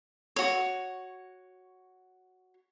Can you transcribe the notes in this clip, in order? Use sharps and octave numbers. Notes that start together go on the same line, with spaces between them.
F#4 C#5